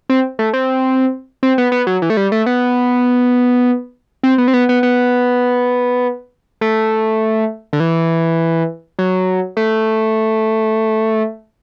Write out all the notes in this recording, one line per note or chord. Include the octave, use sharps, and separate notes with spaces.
C4
A3
C4
C4
B3
B3
F#3
E3
A3
G3
A3
B3
C4
B3
C4
B3
B3
B3
A3
D3
E3
F#3
A3